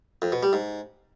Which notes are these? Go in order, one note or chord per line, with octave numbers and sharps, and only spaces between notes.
F2
B2
G3
G#2